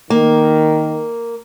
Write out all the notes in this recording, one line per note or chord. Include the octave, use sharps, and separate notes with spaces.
D#3 A#3